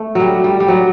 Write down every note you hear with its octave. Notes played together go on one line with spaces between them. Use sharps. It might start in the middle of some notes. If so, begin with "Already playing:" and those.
Already playing: A3
F#3 G3
G3
G3
F#3